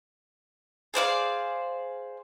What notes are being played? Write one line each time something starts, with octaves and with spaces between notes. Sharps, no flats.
G#4 C5 D5 F5